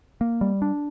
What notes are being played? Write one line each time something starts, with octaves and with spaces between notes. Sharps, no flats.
A#3
G3
D4